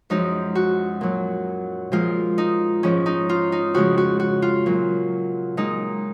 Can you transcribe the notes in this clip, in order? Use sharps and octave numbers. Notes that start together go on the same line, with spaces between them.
F#2 F3 G#3 D#4
F#4
A#2 F#3
A#2 F3 G#3 F4
D#4
G#2 F3 G#3 C#4
D#4
F4
D#4
F2 C#3 F3 G#3 F#4
F#4
F#4
F4
A#2 F#3
A#2 G#3 D#4